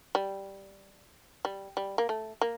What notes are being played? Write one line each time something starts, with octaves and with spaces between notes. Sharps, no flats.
G3
G3
G3
A#3
A3
A#3